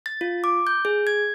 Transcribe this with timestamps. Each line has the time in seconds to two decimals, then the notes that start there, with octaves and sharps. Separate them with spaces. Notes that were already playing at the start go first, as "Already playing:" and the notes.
0.06 A6
0.21 F4
0.44 D6
0.67 G6
0.85 G#4
1.07 G#6